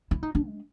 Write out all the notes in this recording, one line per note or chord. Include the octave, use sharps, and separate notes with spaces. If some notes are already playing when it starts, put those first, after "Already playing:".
E4
D#4
D4
G#3